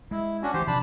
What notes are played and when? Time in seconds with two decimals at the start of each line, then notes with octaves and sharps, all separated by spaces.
0.11 G#3 E4
0.43 C#4 D4 F#4
0.54 D2 E3 G4 C5
0.67 C3 F3 D4 A5 B5